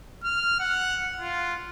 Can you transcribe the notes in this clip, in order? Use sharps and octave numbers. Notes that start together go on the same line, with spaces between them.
F6
F#5
F4